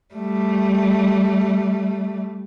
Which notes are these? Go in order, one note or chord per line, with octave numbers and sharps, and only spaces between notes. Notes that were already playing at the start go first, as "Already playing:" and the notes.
G3 A3